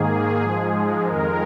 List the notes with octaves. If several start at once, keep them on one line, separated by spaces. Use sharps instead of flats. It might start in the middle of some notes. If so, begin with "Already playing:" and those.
Already playing: G#2 D#3 A#3 G#4
G#2 F3 G#3
F2 D#3 G#3 A#4